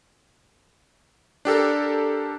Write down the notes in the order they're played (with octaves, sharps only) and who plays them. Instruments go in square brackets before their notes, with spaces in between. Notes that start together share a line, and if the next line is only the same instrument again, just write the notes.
[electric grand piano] D4 G4 A4 A#4